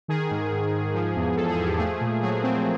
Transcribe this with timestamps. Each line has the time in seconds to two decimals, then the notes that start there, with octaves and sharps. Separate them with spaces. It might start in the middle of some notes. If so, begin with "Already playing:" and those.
0.08 D#3 G#4
0.31 G#2
0.52 G#2
0.74 G#2
0.94 F3
1.16 E2
1.37 F3 A4
1.51 G#4
1.59 F3
1.65 G4
1.79 A3 G#4
2.01 A#2
2.22 F#3 G#4
2.43 C4